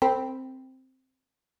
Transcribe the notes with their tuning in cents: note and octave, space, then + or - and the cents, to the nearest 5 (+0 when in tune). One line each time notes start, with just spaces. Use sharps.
C4 +0 A#4 -45 B5 +0